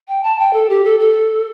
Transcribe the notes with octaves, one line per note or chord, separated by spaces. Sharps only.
G5
A5
G5
A4
G4
A4
A4